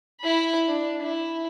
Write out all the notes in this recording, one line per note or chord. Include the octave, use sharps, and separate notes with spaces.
E4 B5
D4
E4